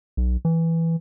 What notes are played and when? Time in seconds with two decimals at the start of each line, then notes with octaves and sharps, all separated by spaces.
0.17 B1
0.45 E3